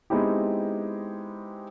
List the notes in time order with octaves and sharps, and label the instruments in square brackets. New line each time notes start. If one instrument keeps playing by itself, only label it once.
[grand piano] G#3 B3 C4 D#4 E4 G4